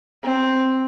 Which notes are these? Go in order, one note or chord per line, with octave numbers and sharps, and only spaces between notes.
C4